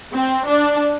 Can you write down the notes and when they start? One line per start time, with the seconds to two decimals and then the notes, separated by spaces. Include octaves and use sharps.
0.14 C4
0.47 D4